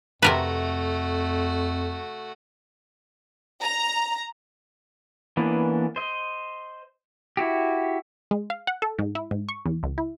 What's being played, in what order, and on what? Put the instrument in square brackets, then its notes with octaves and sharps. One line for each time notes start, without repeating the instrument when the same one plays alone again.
[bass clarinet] F2 [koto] C3 A#4 B4 [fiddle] A3 F#4
[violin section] A#5
[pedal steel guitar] E3 A#3 B3 C#4 D4
C5 D#5
E4 F#4 G4
[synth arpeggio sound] G#3
F5
F#5
A4
G#2
E4
G#2
C#6
E2
C#2
E4